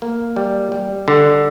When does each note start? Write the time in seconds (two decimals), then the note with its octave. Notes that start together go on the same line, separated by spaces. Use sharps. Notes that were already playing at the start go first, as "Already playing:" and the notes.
0.02 A#3
0.36 G3
0.72 G3
1.08 D3